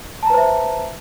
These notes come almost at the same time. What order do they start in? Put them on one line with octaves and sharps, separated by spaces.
A5 A#5 B4 C5 E5